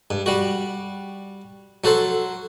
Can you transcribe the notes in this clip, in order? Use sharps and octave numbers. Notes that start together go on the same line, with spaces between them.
G2
G3 F#4
F#3 F#4 A4 C5